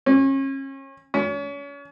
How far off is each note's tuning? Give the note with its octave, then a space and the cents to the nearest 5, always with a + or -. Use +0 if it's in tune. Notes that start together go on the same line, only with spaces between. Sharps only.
C#4 -35
C#4 +35